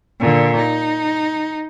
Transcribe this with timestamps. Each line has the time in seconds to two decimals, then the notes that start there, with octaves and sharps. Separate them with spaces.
0.20 A#2 D3
0.57 D#4